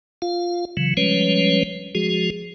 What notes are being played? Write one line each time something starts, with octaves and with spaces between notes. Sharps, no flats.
F4 F5
C#3 E3 F#3
F3 G3 G#3 C#4 B4 C#5
F3 G#3 F#4 G#4